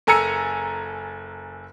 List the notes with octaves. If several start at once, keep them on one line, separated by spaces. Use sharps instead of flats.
F#1 A4 G#5 A#5 E6 C#7